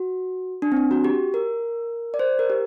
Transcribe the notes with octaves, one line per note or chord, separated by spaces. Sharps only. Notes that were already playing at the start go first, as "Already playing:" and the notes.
Already playing: F#4
D4
C4
D4
F#4
G4
A#4
D5
C5
A#4
G4